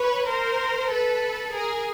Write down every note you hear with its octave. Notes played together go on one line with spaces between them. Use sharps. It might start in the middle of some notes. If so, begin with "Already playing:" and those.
Already playing: B4 C#5
A#4 C5
A4 B4
G#4 A#4